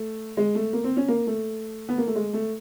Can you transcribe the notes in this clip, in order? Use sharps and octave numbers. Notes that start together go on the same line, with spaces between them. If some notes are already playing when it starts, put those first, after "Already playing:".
Already playing: A3
G#3
A3
A#3
C4
C#4
A#3
A3
B3
A#3
A3
G#3
A3